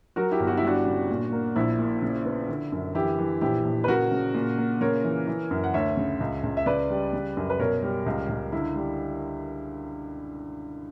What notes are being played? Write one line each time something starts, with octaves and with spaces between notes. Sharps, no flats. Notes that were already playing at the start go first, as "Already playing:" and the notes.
F#3 F#4 A#4
E4 G4
G1
F#4
E4
G3 D4 F#4
C#3
A#2
A#3
A#1 E4
A#2
C#3
B3
D3
F#2
E3 E4 G4
E3
A#1 E4 G4
A#1
B4
C#3 F#4 A#4
C#3
A#2
A#3
C#3 A#4 C#5
E3
E3
F#2
F#5
D2 C#5 E5
C#3
C#2
C#2
E5
C#3 B4 D5
G3
C#3
F#2
B4
B2 A#4 C#5
G3
C#2
C#2
D3 E4
G3